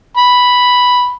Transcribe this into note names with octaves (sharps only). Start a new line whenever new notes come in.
B5